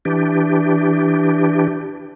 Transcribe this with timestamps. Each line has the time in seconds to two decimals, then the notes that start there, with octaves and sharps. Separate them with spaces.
0.05 E3 D4 G4